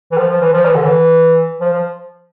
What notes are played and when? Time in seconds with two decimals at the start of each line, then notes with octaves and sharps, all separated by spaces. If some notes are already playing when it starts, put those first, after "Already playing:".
0.12 E3
0.18 F3
0.29 F3
0.41 E3
0.53 F3
0.65 E3
0.75 D3
0.84 E3
1.61 F3
1.73 F3